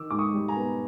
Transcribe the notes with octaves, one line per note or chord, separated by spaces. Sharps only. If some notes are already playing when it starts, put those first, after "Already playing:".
Already playing: D#3 D6 E6
G#2 D6
C#6 D#6
G3
G#5 A#5
B3